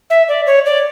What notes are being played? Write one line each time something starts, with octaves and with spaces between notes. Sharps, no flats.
E5
D5
C#5
D5